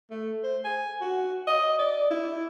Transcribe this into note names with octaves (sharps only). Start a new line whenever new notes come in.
A3
C5
G#5
F#4
D#5
D5
E4